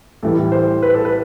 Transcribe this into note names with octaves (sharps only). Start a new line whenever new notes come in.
A2 E3 G3 A4
C5
B4
A4
B4